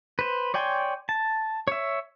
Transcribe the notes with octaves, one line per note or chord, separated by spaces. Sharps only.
B4 C5
C#5 D5 G5 G#5 C6
A5
C#5 E5